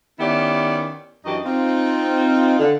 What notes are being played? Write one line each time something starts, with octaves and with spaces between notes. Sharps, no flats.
D#3 B3 C#4 E4 G4 D5
F#2 E3 D4 F#4 G4 D#5
C4 D#4 F4
D3